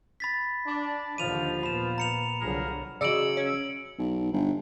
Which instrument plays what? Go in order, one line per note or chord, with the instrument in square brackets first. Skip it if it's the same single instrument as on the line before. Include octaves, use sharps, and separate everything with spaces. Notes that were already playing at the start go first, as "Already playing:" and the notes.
[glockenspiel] B5 A6 B6
[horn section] D4 D5
[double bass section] D#2 D3 D#3 [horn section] F3 [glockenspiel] D#7 F7
[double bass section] A#2 B3 [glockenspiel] B5 E7
[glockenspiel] A#5 C#7 F7
[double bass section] C2 D3 F#3 [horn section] F3 G#4 A#4
[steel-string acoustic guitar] C#3 F#3 [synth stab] D5 D#5 [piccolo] E6 [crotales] C#7 D7 F#7
[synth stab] C#4
[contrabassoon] B1
G1